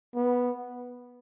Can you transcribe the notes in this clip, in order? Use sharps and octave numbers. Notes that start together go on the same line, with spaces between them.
B3